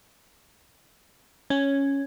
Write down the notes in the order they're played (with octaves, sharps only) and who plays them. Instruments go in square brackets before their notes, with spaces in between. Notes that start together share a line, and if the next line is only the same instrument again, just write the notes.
[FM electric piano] C#4